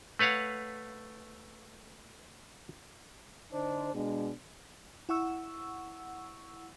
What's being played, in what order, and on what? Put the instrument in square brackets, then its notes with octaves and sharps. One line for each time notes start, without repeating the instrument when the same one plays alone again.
[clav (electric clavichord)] A3 B4 C#5 F5 F#5
[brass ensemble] D3 D4 D#4 C5
B2 G#3 D4
[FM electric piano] E4 F#5 C#6 E6